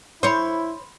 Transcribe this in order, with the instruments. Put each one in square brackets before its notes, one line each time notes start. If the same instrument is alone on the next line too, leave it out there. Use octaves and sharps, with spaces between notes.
[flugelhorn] E4 [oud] C5 C#5 [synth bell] B5 C6